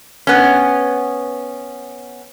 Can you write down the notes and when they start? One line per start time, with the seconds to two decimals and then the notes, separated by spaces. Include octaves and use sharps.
0.27 B3 C#4